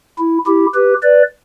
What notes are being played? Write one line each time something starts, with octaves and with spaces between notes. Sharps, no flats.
E4
E4 G4
G4 B4
B4 D5